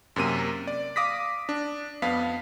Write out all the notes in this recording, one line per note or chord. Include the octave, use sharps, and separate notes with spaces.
F#2 C3 A#3 D#7
D5
F5 D6 D#6 A#6 B6
D4
F2 B3 F5 B6